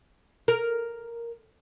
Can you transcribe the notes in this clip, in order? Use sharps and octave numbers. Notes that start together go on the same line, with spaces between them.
A#4